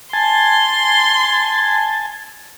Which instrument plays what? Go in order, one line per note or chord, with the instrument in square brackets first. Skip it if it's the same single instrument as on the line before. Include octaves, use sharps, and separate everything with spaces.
[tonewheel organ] G#5 A5 [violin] C6